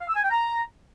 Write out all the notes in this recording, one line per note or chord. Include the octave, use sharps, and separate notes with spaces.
F5
E6
G#5
G5
A#5